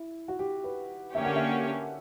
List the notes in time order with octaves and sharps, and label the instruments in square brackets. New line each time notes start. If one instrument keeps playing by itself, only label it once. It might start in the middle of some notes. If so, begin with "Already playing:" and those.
Already playing: [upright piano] E4
F#4
G4
B4
[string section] D3 A#3 C#4 G4 C#5 [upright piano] E5
[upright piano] F#5
E5